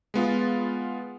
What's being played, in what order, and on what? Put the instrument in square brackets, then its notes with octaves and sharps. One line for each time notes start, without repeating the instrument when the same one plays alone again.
[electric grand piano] G#3 B3 F4